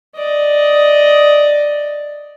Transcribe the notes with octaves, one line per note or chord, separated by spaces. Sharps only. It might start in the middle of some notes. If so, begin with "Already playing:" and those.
D5 D#5